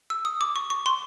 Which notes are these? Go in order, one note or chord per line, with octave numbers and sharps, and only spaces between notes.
E6
D#6
D6
C#6
C#6
C6